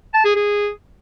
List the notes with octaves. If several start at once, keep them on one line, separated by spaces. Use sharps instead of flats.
A5
G#4
G#4